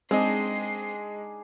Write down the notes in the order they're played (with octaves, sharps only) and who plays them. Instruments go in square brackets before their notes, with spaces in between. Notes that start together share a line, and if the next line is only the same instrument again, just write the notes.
[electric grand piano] G#3 D#5 [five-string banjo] C4 [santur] D4 D#4 G#4 [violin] C7